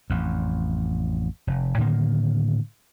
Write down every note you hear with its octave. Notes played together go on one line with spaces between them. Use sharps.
A1 F2
F1
A2 D3 D#3 A#3